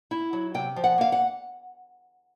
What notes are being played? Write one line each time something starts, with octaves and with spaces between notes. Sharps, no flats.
E4
F#3
C3 G5
F3
F#5
A#3 F5
F#5